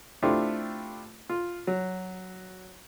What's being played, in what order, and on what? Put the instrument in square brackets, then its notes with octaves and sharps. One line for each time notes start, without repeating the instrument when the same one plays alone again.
[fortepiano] A3 C4 D4 E4 F4 G4
F4
F#3